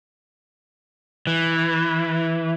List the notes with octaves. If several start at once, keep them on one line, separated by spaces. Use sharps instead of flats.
E3